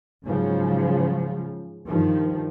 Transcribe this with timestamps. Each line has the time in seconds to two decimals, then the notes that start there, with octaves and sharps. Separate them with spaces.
0.24 G#2 C#3 F3 F#3
1.87 G2 D#3 F3